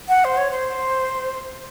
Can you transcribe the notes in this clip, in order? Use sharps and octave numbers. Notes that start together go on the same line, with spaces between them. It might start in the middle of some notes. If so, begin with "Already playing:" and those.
F#5
C5
C#5
C5